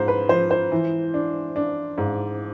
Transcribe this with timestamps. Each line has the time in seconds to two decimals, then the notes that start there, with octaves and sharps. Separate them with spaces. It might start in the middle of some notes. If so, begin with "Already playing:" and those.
Already playing: G#2 F3 C5
0.08 B4
0.29 F3 C5
0.51 C5
0.72 E3
1.14 D4
1.56 D4
1.98 G#2